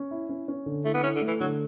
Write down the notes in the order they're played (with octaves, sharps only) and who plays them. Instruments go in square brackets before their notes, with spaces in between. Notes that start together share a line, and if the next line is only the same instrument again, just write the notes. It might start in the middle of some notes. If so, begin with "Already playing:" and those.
Already playing: [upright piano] C#4
E4
C#4
C#4
D3
[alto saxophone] A3 [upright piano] E4
[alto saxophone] B3
[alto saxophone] C#4 [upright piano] E4
[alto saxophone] D3
[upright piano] A3
[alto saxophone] E3
[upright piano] D3 [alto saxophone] F#3